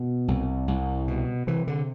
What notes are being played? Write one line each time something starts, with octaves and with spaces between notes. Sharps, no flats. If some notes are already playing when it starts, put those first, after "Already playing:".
Already playing: B2
C2
C2
B2
C3 E3
D3